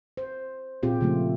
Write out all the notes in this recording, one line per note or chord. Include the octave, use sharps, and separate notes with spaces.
C5
A#2 C4 F4 G4 G#4
C#3 F3 A3